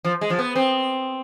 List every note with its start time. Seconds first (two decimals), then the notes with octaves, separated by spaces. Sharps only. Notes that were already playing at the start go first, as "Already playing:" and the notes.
0.05 F3
0.21 G#3
0.30 F3
0.39 B3
0.56 C4